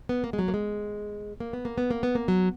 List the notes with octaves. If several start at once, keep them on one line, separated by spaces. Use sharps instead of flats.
B3
A#3
G#3
F#3
A#3
G#3
A#3
B3
A#3
B3
A#3
B3
A#3
F#3